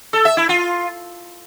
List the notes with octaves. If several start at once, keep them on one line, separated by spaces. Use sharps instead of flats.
A4
E5
E4
F4